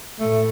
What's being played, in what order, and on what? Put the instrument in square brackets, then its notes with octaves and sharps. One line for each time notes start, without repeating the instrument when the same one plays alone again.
[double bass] A2 [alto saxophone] A3